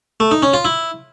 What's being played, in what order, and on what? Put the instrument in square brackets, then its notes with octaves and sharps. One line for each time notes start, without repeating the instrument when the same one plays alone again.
[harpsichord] A3
D#4
C#4
F4
E4